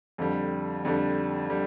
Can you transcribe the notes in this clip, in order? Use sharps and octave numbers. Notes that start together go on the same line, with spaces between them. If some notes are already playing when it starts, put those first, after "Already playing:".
F2 D3 G3
F2 D3 G3
D3 G3